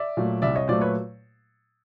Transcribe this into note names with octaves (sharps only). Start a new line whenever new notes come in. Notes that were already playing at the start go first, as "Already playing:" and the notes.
Already playing: D5 E5
A#2 F#3 A3
C2 D5 E5
C#5 D#5
A#2 F#3 A3 C5 D5
B4 C#5